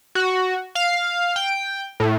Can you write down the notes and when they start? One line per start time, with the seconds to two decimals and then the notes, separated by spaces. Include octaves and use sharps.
0.15 F#4
0.75 F5
1.36 G5
2.00 A2